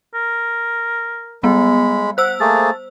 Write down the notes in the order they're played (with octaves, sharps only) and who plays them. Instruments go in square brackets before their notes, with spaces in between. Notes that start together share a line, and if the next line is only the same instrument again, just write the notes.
[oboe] A#4
[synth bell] G3 B3 [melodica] G#3 B5
[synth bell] C5 E6 [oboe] F#5
[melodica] A3 A#3 G#4 [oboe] A5